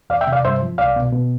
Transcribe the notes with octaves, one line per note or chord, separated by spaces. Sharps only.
E2 D5 F5
E5 G5
C3
D5 F5
G2 C5 E5
F3
C2 D5 F5
B2
B2